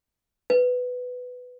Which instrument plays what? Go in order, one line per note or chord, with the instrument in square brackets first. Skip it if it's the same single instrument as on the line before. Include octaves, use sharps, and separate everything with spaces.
[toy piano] B4